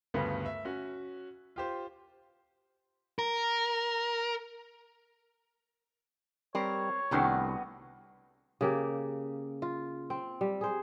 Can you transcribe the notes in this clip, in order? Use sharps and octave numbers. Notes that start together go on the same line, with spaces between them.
D2 G2 C#3 G3 A3 B3
E5
C#4 F#4
F4 G4 C5
A#4
G3 C4 A#4 C#5
C2 D#3 G3 A3 B3 D4 F#4
C#3 A#3 G4
F4
C4
G3
G#4 C5